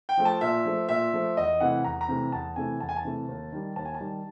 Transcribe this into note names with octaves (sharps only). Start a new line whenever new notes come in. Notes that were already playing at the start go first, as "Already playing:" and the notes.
G5
F3 A3
A5
A#2 E5
F3 A3
A#2 E5
F3 A3
E2 D#5
C3 E3 A3 F#5
E2 A#5
A#5
C3 E3 A3
E2 A5
C3 E3 A3 G#5
E2 A5
G#5
A5
C3 E3 A3
D#2
D#3 G3
D#2 A5
G#5
A5
D#3 G3